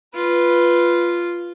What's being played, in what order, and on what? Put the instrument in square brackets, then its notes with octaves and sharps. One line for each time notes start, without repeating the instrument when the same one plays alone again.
[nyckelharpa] F4 [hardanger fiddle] B4